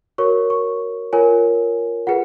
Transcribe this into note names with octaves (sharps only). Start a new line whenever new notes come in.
F#4 A#4 C#5 C#6
C#6
F4 A#4 C#5 G#5
F4 G#4 B4 F#5